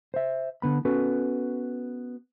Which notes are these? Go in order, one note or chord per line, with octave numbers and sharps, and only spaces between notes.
C5 E5
D3 B3 B5
B3 C#4 F#4 A4 B4